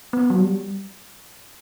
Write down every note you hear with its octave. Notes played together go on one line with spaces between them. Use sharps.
B3
F#3
G3